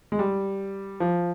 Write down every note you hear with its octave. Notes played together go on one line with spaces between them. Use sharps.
G#3
G3
F3